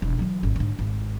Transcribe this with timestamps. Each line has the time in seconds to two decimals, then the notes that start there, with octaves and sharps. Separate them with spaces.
0.02 E1
0.19 E3 F#3
0.43 G#1 C#4
0.56 G#2 D3
0.79 G#1